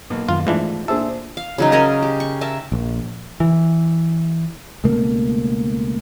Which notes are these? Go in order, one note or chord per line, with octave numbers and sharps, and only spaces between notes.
B1 A#3
F#2 D#3 F4
G#2 E3 A3 D4 F4
A#2 D4 G#4 A4 C5 E5 E6
F5
C#3 F#3 D#4
C#4 A#4 C#5 D#5
G4
C#6
A#4 E5 A5
A#1
E3
C#2 B2 A3 A#3